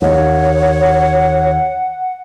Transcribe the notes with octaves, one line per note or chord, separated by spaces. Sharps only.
D#2 C#5 F#5